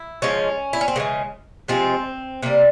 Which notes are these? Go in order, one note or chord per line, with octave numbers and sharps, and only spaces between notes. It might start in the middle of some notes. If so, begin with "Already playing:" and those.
Already playing: E4
C#3 F3 G#3 C#4
E4
C#4
C4
C#3 E3 G#3 A#3
C3 F3 G#3 C4
C3 G3 A#3